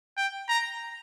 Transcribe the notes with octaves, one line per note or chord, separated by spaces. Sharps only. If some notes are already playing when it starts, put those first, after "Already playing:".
G5
A#5